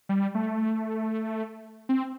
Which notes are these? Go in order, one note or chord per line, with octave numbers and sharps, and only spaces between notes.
G3
A3
C4